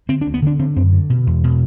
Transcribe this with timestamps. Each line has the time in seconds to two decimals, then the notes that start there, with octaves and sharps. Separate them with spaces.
0.09 D3 C4
0.21 D4
0.26 D2
0.34 B3
0.42 D3 D4
0.59 D3 C4
0.76 F#2 C4
0.93 D3
1.10 B2
1.27 E2
1.44 B2